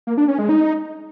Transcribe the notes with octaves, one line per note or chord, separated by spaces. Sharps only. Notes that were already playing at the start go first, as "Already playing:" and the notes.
A#3
D4
C#4
G#3
D#4